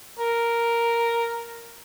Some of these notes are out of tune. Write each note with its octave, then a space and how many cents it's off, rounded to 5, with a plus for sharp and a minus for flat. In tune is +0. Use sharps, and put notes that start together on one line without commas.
A#4 +0